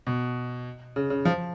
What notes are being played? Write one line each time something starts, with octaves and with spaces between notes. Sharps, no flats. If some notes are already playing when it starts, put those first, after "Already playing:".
B2
C#3
C#3
F3